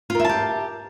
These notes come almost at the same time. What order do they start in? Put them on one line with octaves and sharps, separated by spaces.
F4 A#4 E5 A5 G4